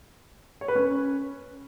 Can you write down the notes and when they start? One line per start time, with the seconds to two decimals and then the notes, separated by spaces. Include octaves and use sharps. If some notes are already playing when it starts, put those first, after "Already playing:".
0.61 C#5
0.68 B4
0.75 C#4